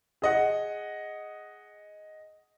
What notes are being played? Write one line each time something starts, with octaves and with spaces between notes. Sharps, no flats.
G#4 D#5 F#5